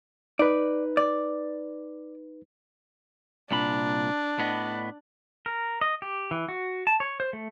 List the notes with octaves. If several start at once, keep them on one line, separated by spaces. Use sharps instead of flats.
D#4 B4 D5
D5
C2 A#2 D4 B5
A2 B3 D#5
A#4
D#5
G4
E3
F#4
A5
C#5
C5
A3